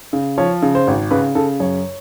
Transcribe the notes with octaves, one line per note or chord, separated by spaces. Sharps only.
C#3
F3 C#5
C#3
C5
G#1
C#3 B4
C#3 A4
F#2 C#5